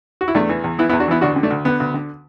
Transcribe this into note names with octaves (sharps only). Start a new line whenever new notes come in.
F#4
E4
E2 A3 D4
E3
E2
E3 B3 E4
B3 E4
E2
D4 F#4
E3 B3 E4
D2 D4 F#4
D3
A3 D4
D2
D3 B3
D2
D3